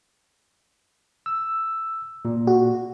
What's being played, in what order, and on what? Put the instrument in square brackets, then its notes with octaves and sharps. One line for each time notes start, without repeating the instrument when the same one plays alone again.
[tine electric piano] E6
A#2
[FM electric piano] F#4